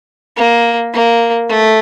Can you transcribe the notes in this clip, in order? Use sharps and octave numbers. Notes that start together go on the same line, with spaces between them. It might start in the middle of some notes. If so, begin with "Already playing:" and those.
A#3
A#3
A3